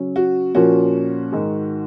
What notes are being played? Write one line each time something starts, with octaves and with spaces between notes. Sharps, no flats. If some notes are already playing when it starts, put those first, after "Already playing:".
Already playing: C#3 F#3 C#4
F#4
A#2 F3 A#3 C#4 F#4
G#2 D#3 G#3